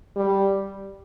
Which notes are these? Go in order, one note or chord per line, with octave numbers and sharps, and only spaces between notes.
G3